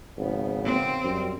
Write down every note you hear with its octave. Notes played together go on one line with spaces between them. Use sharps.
G#1 C#3 F3 B3
C4
F#2 G3